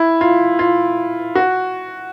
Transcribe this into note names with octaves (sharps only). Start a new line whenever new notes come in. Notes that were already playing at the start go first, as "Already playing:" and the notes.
Already playing: E4
F4
F4
F#4